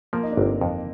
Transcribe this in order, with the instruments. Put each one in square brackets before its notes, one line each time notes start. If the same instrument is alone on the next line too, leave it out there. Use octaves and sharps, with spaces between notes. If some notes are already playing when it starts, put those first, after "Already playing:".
[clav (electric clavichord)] F3 [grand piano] A#3
[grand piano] D#4
D4
[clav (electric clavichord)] G1 [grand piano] C4
[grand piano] A#3
[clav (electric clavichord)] F2